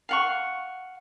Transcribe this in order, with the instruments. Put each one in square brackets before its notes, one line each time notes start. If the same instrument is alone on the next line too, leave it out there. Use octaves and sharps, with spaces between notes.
[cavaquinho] F5 F#5 C#6